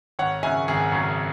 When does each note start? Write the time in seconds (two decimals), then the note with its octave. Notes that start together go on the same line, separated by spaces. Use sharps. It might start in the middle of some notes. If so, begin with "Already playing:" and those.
0.19 G#1 C#5 F#5
0.43 F#2 C#3 E5 G#5
0.68 G#1 G#4
0.92 F#2 C#3